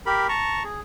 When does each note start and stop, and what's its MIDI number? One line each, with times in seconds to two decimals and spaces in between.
0.06 0.27 67
0.06 0.27 70
0.06 0.27 83
0.29 0.63 81
0.29 0.63 82
0.29 0.63 85
0.64 0.81 68